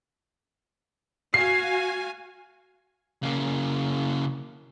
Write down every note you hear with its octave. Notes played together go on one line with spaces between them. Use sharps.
F#4 F5 G#5 C7
C#3 A#3